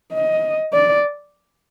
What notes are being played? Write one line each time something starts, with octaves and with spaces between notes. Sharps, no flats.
D#5
D5